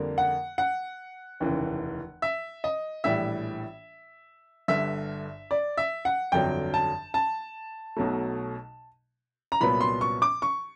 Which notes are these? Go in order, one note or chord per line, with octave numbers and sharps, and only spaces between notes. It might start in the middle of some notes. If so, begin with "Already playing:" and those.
Already playing: F2 D3 G3 A#3
F#5
F#5
F1 D#2 C#3 E3
E5
D#5
A#1 A2 E3 G3 E5
G1 G2 D3 E5
D5
E5
F#5
G1 F2 D3 F#3 G5
A5
A5
B1 B2 F#3 A3
A#5
C2 A#2 F#3 B3 B5
C6
C#6
D6
C#6